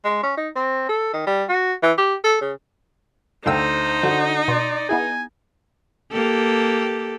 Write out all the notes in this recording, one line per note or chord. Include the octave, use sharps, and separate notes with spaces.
G#3
C#4
D#4
C4
A4
D#3
G3
F#4
E3
G4
A4
C#3
D2 D#4 C5 F5 G5 E6
D3 F#4
B2 D5 C6
B3 E4 G#4 G#5
A#3 G4 A4